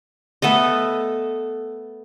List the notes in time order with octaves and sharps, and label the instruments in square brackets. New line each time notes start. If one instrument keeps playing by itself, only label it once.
[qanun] A3 B3 A4 D#5